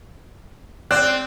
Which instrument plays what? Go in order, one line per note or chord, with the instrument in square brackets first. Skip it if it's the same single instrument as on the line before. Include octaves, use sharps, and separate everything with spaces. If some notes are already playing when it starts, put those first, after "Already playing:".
[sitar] C4 [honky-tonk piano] D5 [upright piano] F#6